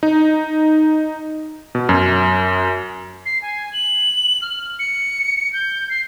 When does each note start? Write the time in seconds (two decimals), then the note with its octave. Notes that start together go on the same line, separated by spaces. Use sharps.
0.03 D#4
1.75 B2
1.89 F#2
3.26 C7
3.42 G#5
3.73 F#7
4.42 F6
4.79 C#7
5.53 G6
5.90 C7